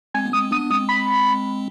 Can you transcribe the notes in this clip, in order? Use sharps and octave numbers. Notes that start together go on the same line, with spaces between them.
G#3 C4 G#5
B3
G#3 C4 D#6
B3 D4 D#6
G#3 C4 D#6
B5